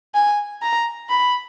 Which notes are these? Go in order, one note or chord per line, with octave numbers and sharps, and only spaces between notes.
G#5
A#5
B5